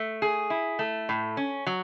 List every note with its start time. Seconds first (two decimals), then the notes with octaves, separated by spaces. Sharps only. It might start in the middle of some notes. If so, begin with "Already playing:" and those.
Already playing: A3
0.22 G#4
0.50 E4
0.79 A3
1.09 A2
1.37 C#4
1.67 F#3